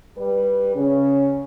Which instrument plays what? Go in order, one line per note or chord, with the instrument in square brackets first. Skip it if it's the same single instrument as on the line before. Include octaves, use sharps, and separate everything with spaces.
[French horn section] G3 B4
[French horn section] C#3 [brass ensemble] C#4